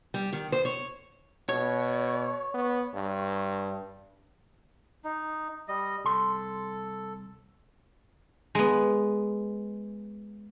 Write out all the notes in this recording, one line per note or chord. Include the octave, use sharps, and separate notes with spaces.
G3
D#3
C5
C#5
B2 C#5
B3
G2
D#4
G3 D#5
C2 A4 C6
G#3 B3